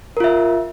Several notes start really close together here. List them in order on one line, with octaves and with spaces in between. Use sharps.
A#4 F4 E5